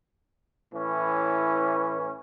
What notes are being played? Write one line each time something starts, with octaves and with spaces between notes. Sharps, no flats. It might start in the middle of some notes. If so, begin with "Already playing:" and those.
A2 E3 C#4